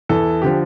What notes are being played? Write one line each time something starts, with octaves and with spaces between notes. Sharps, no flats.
E2 E3 A4
D3 F3 G4